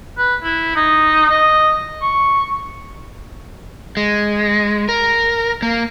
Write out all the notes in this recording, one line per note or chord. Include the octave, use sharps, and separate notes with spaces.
B4
E4
D#4
D#5
C#6
G#3
A#4
A#3